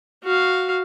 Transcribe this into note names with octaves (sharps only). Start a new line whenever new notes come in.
F#4 F5